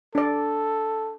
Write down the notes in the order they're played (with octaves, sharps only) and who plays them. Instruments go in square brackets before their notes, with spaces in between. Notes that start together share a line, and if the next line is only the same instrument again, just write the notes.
[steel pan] D4 D5 [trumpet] A4